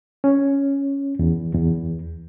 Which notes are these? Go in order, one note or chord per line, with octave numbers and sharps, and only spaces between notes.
C#4
E2
E2